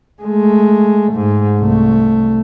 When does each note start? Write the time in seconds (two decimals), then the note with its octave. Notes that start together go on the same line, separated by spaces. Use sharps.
0.22 G#3 A3
1.14 G#2
1.59 C2 A3